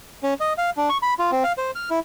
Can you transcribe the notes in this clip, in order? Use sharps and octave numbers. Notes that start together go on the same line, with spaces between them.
C#4
D#5
F5
D4
C#6
B5
F4
C4
F5
C5
F6
E4